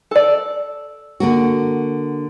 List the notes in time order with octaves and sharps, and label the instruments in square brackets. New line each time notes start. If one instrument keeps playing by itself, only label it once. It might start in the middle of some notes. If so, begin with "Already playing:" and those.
[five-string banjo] A4 D5
[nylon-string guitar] D3 A#3 F#4